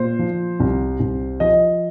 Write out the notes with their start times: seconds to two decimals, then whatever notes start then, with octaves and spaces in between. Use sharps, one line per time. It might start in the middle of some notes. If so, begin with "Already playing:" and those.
Already playing: A#2 C5
0.19 F3
0.60 C2
1.00 C2
1.40 F3 D#5